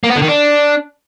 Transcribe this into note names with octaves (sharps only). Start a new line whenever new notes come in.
A#3
B3
D3
D#3
D4